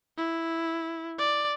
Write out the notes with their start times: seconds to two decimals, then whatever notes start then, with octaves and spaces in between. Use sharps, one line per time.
0.17 E4
1.19 D5